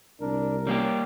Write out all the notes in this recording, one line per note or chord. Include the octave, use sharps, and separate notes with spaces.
C2 D4 A#4
G3 A#3 C#4 G4